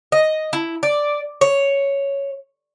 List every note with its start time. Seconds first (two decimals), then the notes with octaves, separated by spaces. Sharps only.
0.12 D#5
0.53 E4
0.83 D5
1.41 C#5